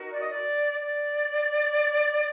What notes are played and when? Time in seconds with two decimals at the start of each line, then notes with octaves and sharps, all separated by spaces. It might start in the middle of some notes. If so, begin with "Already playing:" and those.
Already playing: D#4 F#4 A#4
0.10 D5
0.19 D#5
0.28 D5
0.81 D5